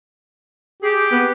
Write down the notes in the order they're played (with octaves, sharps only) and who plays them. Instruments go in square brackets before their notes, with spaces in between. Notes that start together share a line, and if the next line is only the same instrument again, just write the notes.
[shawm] G4 [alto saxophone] G#4
[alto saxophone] B3